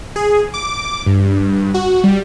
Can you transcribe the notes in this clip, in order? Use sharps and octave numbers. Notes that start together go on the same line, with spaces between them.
G#4
D6
G2
F#4
G3